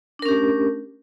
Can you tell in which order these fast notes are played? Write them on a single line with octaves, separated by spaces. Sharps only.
D4 A#4 C#4 G4 A3